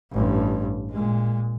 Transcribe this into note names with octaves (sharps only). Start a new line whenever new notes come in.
A1 G2
A#2 G#3